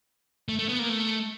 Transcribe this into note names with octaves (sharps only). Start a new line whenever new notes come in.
A3
A3
B3
A#3
A3